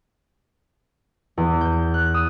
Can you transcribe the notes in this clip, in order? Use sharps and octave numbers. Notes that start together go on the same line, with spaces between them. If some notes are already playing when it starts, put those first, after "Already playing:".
E2
G6
F#6
D#6